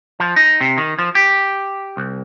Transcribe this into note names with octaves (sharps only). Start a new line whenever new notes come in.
F3
D#4
C3
D#3
F3
G4
C2